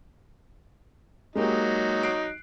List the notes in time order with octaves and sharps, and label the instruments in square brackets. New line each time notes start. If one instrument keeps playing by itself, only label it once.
[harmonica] F#3 D#4 [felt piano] G#3 A#3 G4
[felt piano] F#6 C7 D7